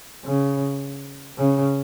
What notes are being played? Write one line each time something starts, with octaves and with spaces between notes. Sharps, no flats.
C#3
C#3